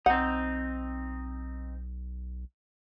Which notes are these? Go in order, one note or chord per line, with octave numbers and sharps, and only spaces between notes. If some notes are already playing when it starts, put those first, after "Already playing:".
B1 C4 D#4 F#5